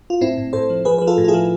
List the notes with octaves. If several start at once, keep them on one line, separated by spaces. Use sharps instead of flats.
F4
A2 C4 E4
A2
A2 A4 C5
F3
F3 G#4 B4
F3 B4
F4 A4
A2
F4
E4 G#4
F3